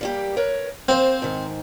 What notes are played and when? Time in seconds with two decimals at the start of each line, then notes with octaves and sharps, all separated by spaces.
0.01 G3 A#3 G4
0.37 A#4 B4 C#5
0.89 A#3 C4 C5
1.22 G#2 D#3